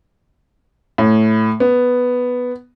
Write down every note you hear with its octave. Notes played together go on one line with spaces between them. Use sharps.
A2
B3